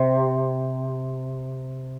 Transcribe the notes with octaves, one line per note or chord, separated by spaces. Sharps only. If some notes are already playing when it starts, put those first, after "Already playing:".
Already playing: C3